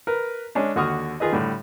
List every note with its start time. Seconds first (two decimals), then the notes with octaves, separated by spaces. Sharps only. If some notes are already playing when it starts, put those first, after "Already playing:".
0.07 A#4 B4
0.55 G#3 C#4 D4
0.76 D#2 D3 F#4 C#6 D#6 F6
1.20 D#3 F4 G#4 B4 D#5
1.33 A2 D3 G3